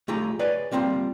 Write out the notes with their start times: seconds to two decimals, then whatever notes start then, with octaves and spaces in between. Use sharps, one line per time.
0.08 A3 D#4 F4 G4 G#4
0.39 G#4 B4 C#5 D5 G#5
0.72 G3 A#3 C4 D#4 F4